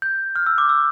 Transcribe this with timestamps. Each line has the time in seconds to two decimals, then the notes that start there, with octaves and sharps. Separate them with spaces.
0.02 G6
0.36 F6
0.46 E6
0.58 D6
0.69 E6